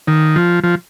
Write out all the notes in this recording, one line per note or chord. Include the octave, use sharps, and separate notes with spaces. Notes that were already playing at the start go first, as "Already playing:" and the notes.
D#3
F3
F3